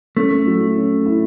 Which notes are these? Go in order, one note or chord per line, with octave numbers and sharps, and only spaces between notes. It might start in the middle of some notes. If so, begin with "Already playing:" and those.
A3 C#4
F#3
C#4
E4